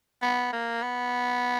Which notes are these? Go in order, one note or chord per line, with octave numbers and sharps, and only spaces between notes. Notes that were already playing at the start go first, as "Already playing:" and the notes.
B3
A#3
B3